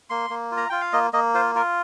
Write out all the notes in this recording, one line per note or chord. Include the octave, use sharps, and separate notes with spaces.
A#3 C6
A#3
F4
A#5
F4 G5
F5
A#3 D#5
A#3 D#5
F4 C5
F4 A#4